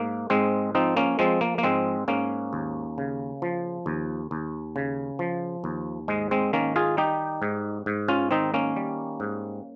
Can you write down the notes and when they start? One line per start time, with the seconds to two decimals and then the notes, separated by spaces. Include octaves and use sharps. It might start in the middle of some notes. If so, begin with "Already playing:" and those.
Already playing: G#2 A#3
0.30 G#2 G#3 C4
0.75 F3 C4 D#4
0.97 A#3 C#4
1.19 F3 G#3 C4
1.41 A#3
1.58 A#3
1.63 G#2 G#3 C4
2.08 G#2 A#3 C#4
2.53 D#2
2.98 C#3
3.42 F3
3.86 D#2
4.31 D#2
4.76 C#3
5.19 F3
5.64 D#2
6.08 G#2 G#3
6.31 G#3 C4
6.53 D#3 A#3 C#4
6.76 F4 G#4
6.97 G3 D#4 G4
7.42 G#2
7.86 G#2
8.08 C#4 F4
8.31 D#3 C4 D#4
8.54 A#3 C#4
8.76 G3
9.20 G#2